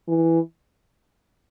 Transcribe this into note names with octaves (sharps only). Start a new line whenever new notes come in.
E3